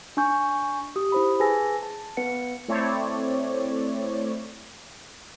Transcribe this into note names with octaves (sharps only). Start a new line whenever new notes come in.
D4 G#5 C#6 G6
G4 D#6
E4 C5 B5
G#4 B4 G#5 A5 E6 A#6
A5
B3 B4 F#5 C#7
A3 C4 E4 C#5 D5